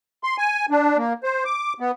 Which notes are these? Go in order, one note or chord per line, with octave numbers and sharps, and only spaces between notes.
C6
G#5
D4
A#3
C5
D6
B3